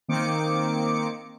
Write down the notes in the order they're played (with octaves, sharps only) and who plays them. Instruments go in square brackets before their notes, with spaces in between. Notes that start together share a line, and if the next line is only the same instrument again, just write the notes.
[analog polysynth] D#3 A#3 C4 D6 C#7